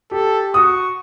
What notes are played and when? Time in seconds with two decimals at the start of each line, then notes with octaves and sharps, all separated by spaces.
0.11 G4 A4
0.54 F#4 C#6 D#6